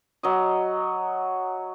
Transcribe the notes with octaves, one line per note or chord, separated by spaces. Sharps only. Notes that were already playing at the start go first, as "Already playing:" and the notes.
F#3 D#5